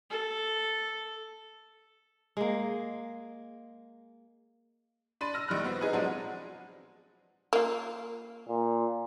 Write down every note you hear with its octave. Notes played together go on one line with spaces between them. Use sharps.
A4
G#3 A#3
D4 B5 C6 A6 D#7
E6 F6 A#6
A#1 D#3 G3 F6 F#6
B3 C4 F#4
D#4 G#4 B4
C3 F3 F#3 G#3 D4 F#4
A#3 F4
A#2